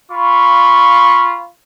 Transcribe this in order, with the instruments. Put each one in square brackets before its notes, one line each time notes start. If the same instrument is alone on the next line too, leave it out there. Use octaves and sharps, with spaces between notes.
[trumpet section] F4 F5 B5 C#6